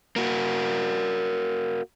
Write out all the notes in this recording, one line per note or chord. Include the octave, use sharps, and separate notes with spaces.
A#3 F#4